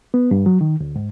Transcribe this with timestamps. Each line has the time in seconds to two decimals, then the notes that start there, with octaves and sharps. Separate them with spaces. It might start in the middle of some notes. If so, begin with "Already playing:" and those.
0.14 B3
0.31 G2
0.46 F#3
0.61 D#3
0.81 D2
0.96 G#2